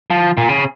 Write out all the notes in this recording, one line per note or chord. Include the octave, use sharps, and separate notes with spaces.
F3
A#2
C#3